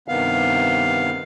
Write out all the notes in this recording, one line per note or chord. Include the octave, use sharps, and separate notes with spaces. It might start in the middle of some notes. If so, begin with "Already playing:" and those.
G2 C3 D#3 B3 F5